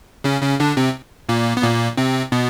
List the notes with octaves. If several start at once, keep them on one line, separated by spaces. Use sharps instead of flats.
C#3 C#4
C#3 C#4
D3 D4
C3 C4
A#2 A#3
B3
A#2 A#3
C3 C4
B2 B3